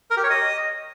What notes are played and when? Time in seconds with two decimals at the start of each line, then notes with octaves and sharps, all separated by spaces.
0.10 A#4
0.17 G4
0.24 C#5
0.30 D#5